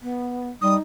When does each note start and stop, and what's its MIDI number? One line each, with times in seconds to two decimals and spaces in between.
0.01 0.49 59
0.62 0.76 55
0.62 0.80 63
0.62 0.75 87